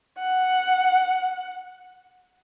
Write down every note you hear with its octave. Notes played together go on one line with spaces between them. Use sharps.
F#5